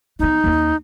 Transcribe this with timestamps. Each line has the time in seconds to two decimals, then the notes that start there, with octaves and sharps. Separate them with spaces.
0.19 F3 B3 D#4
0.44 D#2 C#4